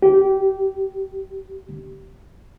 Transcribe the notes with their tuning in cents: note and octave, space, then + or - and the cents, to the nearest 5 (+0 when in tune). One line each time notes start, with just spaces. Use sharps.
G4 -20